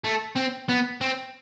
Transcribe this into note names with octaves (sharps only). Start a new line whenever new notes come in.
A3
C4
B3
C4